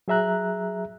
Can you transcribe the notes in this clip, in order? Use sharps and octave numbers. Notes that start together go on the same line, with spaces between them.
F#3 G#4 E5 A#5 F#6